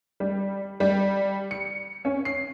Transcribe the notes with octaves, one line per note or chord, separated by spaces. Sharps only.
G3
G3
C#7
C#4
C7